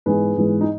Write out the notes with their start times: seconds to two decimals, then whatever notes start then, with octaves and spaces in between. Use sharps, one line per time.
0.06 G#2 E3 G#3 B3 G#4 B4
0.37 G#2 E3 G#3 B3
0.61 D#4